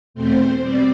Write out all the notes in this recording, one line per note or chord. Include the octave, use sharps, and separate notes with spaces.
E2 B2 A3 C4 C5
B2 G3 C4 D5